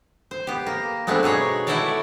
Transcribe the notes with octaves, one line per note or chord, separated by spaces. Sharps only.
C5
B3 G4
A#3
G#3 A3 B3 C4 D4
B2 D#4 G#4 C#5
A3 E4 F#4 A4 C#5 D5